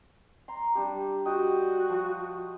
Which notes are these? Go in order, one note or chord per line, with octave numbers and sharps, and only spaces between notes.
A#5 C6
G3 D4 G4
F#4 D#5 G5
F3